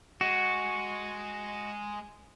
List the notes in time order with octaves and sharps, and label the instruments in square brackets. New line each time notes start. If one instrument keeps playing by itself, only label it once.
[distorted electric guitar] G#3 [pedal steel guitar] F#4